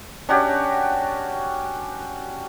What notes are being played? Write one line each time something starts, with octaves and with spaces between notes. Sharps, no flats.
C#4 D4 F#4 G4